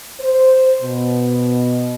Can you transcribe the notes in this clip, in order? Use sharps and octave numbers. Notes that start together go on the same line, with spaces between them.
C5
B2